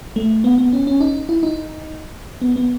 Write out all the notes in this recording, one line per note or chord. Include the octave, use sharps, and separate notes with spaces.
A3
B3
B3
C#4
C#4
D#4
E4
D#4
B3
B3